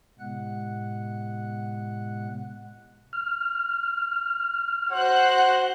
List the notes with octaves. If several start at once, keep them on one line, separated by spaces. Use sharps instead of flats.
A2 C3 G#3 B3 F#5 F#6
F6
F#4 C5 F#5 F#6